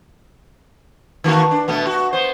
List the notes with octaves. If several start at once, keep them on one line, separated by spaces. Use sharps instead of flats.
D#3 A#3 F#4
D4
B2 A3 B3
F#4
B3 C5